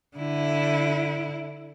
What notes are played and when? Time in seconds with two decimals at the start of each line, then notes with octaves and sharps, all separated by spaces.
0.17 D3 E4